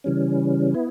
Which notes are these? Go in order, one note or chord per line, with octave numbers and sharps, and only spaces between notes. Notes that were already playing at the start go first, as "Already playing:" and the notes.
C#3 E3 G3 C#4
B3 E4